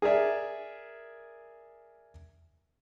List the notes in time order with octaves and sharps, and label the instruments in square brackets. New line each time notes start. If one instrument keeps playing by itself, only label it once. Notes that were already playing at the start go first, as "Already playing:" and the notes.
[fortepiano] G#4 A#4 D5 E5